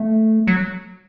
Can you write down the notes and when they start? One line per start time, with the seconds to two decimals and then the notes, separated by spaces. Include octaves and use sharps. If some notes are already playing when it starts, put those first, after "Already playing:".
Already playing: A3
0.47 F#3